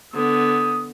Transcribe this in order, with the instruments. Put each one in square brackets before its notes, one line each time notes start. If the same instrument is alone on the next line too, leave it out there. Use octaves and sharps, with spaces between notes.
[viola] D3 B3 [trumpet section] D#6